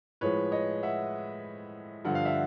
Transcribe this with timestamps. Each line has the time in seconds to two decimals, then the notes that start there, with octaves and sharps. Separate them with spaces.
0.21 A2 F3 G#3 B4 C#5
0.52 C#5 D#5
0.83 E5 F#5
2.05 G2 D3 F3 F#5
2.15 F5
2.25 E5 F#5